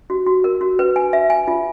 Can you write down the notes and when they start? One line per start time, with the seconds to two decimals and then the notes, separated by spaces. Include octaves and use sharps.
0.10 F#4
0.26 F#4
0.44 A#4
0.61 F#4
0.79 B4
0.96 G#5
1.13 E5
1.30 G#5
1.48 F4